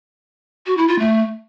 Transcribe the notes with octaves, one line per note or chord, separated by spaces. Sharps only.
F#4
E4
F4
A3